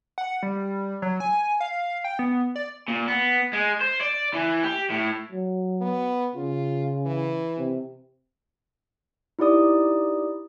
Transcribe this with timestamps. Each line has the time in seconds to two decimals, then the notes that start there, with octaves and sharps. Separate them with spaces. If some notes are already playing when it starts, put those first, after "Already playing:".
0.18 F#5
0.43 G3
1.02 F#3
1.20 G#5
1.61 F5
2.04 G5
2.19 B3
2.56 D5
2.88 A#2
3.08 B3
3.53 G#3
3.81 C5
4.01 D5
4.34 E3
4.63 G4
4.90 A2
5.32 F#3
5.81 B3
6.36 C#3 F4
7.06 E3
7.59 C3
9.39 D#4 E4 G4 D5 D#6